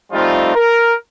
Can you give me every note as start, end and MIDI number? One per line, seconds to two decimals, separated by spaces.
0.12 0.51 53
0.12 0.51 55
0.12 0.51 57
0.12 0.51 60
0.12 0.51 63
0.12 0.51 65
0.54 0.94 70